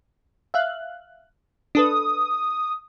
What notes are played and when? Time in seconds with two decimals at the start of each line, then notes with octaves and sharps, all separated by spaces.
0.54 E5 F5 F#6
1.75 D4 A4 B4 D#6